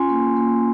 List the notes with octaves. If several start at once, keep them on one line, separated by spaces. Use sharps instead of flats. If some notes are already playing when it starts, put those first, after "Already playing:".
Already playing: C#4 F4 G#5 C6
A#3
A#3